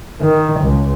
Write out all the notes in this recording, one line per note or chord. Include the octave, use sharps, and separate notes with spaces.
D#3
C#2